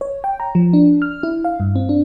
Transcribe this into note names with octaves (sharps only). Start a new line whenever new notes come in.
C#5
G5
A#5
F3
D4
F6
E4
F5
G2
C4
D4